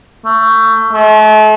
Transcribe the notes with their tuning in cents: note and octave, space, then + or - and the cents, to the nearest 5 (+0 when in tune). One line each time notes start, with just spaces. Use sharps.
A3 +25
A3 -40